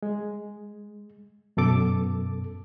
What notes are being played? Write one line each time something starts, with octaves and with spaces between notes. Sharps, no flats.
G#3
F#2 B2 A4 D6